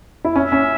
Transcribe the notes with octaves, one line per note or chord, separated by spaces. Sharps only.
E4
C#4 E5
C#4